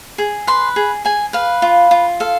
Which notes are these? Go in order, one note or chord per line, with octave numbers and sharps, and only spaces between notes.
G#4
B4 C6
G#4
G#4 G#5
B4 F5
F4
F4
A4 F5